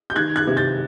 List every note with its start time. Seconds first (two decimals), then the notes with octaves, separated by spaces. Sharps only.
0.10 G6
0.16 D#3 F#6 G#6
0.36 F#6 G#6
0.47 C3
0.57 G6 A6